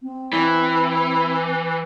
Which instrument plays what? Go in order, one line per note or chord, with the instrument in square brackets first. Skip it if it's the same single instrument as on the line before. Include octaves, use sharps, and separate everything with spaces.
[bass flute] C4
[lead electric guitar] E3